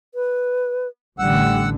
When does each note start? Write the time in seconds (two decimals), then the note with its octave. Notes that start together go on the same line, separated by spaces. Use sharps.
0.15 B4
1.19 A1 D3 G3 F#5 E6